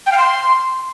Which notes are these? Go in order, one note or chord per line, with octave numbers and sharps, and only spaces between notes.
G5
F5
C6